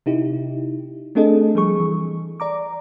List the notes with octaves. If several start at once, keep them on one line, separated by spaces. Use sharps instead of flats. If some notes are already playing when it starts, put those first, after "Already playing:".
C3 D#4 E4 G4
A3 C4 D4 G#4 A4 D#5
F3 G3 G#4 C#6
E3
D5 A#5 D6